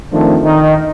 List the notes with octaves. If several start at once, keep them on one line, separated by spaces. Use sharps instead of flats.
D#3 F3 A3 C4 D4
D#3 D#4